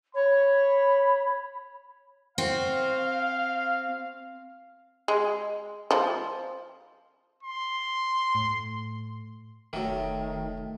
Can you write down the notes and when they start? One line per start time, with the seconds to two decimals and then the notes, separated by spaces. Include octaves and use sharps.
0.14 C#5 B5
2.38 C4 F#4 F5
5.08 G#3
5.91 F3
7.43 C6
8.35 A2
9.73 F1 D#3 F#3 A3